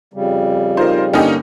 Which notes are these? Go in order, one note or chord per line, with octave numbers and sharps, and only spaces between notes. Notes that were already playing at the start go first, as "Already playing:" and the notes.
F2 C#3 G3
D#4 F4 A#4 C5
G2 D3 A#3 C#4 D#4 G4